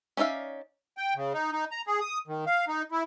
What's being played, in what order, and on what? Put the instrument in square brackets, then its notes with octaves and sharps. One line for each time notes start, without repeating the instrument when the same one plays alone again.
[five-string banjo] C#4 D#4 D5 E5 F5
[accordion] G5
C#3
D#4
D#4
A#5
G#4
D#6
D#3
F5
D#4
E4